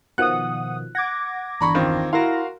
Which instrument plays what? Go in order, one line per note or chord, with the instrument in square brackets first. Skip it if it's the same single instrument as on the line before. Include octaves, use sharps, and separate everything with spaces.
[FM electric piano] B2 D#3 F3 [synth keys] F#5 D#6 [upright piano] F#6
[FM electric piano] F#5 [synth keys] D6 G#6 A#6
[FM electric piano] G1 E2 D4 [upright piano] A#5 B5 C#6
[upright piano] D#3 C4 F4
[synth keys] E4 [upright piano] F#4 A#4 F5 [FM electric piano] C6 A#6